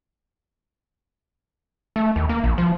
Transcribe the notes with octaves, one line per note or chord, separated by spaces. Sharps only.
A3
D#2
A#3
A#1
F3